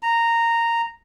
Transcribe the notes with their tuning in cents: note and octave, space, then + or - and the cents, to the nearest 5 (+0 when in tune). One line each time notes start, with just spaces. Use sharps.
A#5 -10